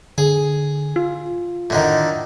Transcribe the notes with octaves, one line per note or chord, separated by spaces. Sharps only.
D3 G#4
F4
A2 D3 D#3